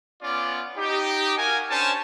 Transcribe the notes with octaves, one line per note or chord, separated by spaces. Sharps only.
B3 C#4 F4 D5
D#4 G4
F#4 A#4 F5 G#5
C#4 D4 C5 C#5 G#5 A5